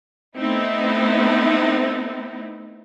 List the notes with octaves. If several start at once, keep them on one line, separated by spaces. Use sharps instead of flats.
A3 B3 C4 D#4 E4